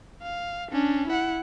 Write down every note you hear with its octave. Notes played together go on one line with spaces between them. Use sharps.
F5
C#4 D4
E4 F#5